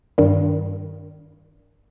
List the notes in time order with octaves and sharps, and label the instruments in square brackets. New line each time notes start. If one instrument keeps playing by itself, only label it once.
[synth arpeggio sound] G2 D#3 G3